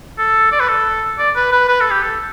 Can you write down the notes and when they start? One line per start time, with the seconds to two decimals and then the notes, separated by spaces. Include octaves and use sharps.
0.18 A4
0.52 D5
0.60 B4
0.68 A4
1.18 D5
1.36 B4
1.52 B4
1.68 B4
1.81 A4
1.91 G4
2.03 A4